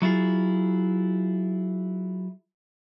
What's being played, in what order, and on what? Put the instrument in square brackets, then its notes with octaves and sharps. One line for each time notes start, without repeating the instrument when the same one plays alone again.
[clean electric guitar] F#3 E4 F4 G#4